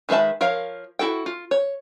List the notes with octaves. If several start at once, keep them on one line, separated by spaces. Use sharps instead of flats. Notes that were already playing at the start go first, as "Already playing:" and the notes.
D#3 G#3 B4 E5 A5
F3 A#4 C#5 F5
E4 F#4 A4 G5
F4
C#5